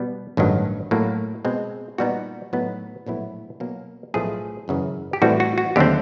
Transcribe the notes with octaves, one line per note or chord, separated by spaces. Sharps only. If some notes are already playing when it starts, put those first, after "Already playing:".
Already playing: B2 G3 B3
A1 G2 D#3 F#3
A2 F#3 A#3
B2 G#3 C4
A#2 G3 B3 D#4 F#4
A2 F#3 B3 D#4
A#1 A2 F#3 B3 E4
B2 F#3 A#3
B1 A2 F3 A3 G#4
G#1 F#2 C#3 E3
G4
A2 E3 G3 C4 F#4
F#4
F#4
D#2 D3 F#3 A3 C4 G4